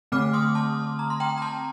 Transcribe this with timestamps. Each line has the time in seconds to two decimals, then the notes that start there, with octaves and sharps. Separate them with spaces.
0.12 D3 A3 C4 D6 F6
0.33 C6 D#6
0.55 A5 C6
0.99 A#5
1.10 C6
1.20 G5 A#5
1.38 A#5
1.42 A5 C6